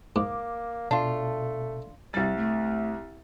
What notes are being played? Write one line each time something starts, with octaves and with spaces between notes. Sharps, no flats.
G#2 A#3 D6
B2 A3 D4 F4
C2 G3 A6
A3